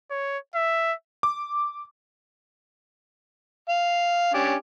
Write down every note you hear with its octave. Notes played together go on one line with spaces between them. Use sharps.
C#5
E5
D6
F5
C#4 D4 G4